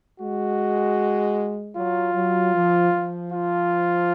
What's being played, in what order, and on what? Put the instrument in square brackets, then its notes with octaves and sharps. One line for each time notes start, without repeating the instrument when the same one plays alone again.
[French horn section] G#3 [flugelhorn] F#4
[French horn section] F#3 [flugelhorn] F4
[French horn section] F#3
F3
F3
[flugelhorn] F4